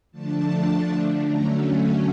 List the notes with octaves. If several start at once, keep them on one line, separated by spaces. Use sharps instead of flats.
D3 F3 A3 D4 A5
D3 F#3 A3 C#4 A#5